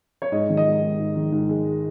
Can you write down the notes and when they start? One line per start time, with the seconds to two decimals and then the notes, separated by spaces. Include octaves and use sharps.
0.22 C#5
0.32 G#2 D#5
0.49 D#3
0.57 D#5
0.66 G#2
0.82 G#3
0.99 G#2
1.15 D#3
1.32 G#2
1.49 G#3